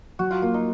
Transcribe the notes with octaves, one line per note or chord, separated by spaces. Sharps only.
F#3 F#4
F4
A#3 F4
D#4